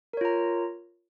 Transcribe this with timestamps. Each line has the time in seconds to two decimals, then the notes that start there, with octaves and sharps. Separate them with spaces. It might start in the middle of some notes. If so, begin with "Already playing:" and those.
0.13 A#4
0.17 C#5
0.21 F4
0.25 A#5